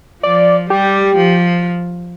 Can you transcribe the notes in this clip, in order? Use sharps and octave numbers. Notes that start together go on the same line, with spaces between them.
F3 D5
G3 G4
F3